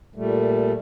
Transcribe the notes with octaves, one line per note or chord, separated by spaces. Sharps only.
A#2 G3 A3